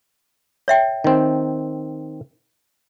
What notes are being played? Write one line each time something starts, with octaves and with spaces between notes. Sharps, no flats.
C#5 E5 G5
D#3 C4